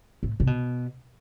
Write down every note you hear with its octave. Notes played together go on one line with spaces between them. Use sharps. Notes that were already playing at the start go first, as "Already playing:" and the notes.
A2
C3
B2